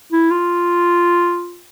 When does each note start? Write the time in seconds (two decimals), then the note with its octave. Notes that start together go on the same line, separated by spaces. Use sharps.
0.12 E4
0.31 F4